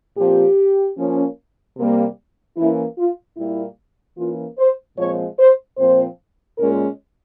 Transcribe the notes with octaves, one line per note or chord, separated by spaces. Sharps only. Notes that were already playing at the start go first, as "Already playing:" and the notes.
A#2 F3 C4 G4
F3 A#3 C#4
C3 G3 A#3
E3 A#3 C#4 E4
F4
A#2 G3 A#3 E4
E3 A#3 C#4 F4
C5
A#2 F3 G#3 C4 C#5
C5
A#2 F3 C4 C5
A#2 G#3 C#4 A#4